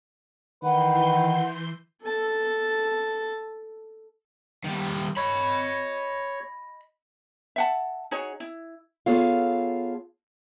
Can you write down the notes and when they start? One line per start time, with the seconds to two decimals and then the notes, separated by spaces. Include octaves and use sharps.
0.63 D#3 E3 B4 F#5 C6 G6
2.03 A4 A5
4.64 D#3 G3
5.17 C#5 D#5 B5
7.56 E5 F#5 A5
8.11 D#4 F#4 G#4 C#5
8.40 E4
9.06 B3 F4 G#4 A4 C#5 F5